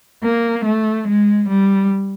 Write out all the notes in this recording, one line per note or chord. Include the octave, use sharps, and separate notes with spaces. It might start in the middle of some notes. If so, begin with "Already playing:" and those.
A#3
A3
G#3
G3